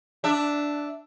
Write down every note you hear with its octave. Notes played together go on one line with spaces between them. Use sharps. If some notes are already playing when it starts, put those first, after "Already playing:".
D4 E5